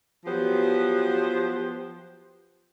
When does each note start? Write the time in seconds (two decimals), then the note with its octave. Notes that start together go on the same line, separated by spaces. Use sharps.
0.25 F3 F#3 B3 G4 C5